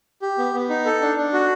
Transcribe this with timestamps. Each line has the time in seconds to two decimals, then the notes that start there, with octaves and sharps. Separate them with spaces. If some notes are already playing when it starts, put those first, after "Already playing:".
0.22 G4
0.38 B3
0.54 B3
0.69 D#4
0.85 A4
1.01 D4
1.18 D4
1.33 F#4